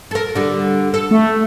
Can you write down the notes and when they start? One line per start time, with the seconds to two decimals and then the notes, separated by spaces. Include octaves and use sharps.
0.11 A4 A#4
0.35 D3 G3
0.94 A4
1.11 A3